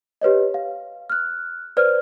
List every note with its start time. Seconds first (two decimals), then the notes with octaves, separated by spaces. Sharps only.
0.21 G4 B4 C#5 D#5
0.54 F5
1.10 F6 F#6
1.77 B4 C5 D5 F6